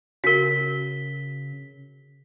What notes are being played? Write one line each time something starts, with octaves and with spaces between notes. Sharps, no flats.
C#3 F#4 A#4 B6 G7